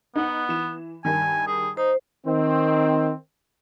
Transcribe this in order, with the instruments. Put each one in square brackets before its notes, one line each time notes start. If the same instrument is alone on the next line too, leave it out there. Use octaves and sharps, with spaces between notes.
[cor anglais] B3 [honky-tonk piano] D#4 F#5
[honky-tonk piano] E3 E7
[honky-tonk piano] G2 D#3 [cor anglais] G#5
[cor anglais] G#4
[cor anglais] D#4 [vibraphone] C5
[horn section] D#3 C4